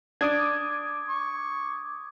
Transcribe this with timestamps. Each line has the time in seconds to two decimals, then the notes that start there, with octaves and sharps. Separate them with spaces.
0.21 D4 D6 D#6 G#6
1.09 C#6